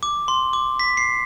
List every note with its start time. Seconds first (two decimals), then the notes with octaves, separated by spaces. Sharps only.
0.03 D6
0.28 C6
0.53 D6
0.80 B6
0.97 C7